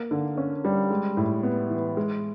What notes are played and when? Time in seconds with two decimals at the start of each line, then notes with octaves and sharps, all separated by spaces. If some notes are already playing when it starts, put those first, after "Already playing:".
Already playing: A#3
0.11 D3
0.38 C#4
0.65 G3
0.91 G#3
1.17 A2
1.43 B3
1.70 E3
1.97 G#3